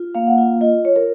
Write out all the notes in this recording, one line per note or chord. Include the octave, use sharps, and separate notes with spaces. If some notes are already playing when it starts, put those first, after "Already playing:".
Already playing: F4
A#3 F5
F#5
F4 F5
F4 D#5
F4 C#5
A#4